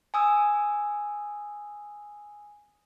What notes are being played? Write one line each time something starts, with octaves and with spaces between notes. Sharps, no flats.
G#5 D#6 E6